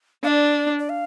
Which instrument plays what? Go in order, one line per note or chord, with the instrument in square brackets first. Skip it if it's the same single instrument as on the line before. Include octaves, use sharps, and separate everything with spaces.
[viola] D4 [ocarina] F5
[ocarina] D5
D5
F5